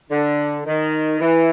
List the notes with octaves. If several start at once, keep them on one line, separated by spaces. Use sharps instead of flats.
D3
D#3
E3